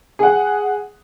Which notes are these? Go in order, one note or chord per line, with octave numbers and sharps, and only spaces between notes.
G#4 F#5